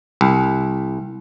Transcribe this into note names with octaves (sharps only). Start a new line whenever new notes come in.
C2